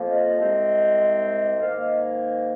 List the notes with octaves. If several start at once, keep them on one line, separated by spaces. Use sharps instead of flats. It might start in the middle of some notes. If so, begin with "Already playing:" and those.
Already playing: F2 F3 A#3
D#5
C2 C3 G#3 C4
G#2 D#3 A#3 F5
D#5